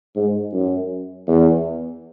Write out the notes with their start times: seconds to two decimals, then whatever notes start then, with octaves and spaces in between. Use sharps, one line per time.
0.16 G#2
0.53 F#2
1.27 E2